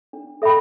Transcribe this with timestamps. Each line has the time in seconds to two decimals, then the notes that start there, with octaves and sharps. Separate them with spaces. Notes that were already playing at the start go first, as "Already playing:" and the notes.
0.13 D4
0.42 A4 E5 G5 B5